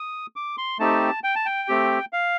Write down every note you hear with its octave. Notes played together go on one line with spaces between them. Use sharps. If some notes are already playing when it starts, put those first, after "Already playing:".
Already playing: D#6
D6
C6
A3 C4 D#4 G4 A5
G5
A5
G5
A3 C4 G4
F5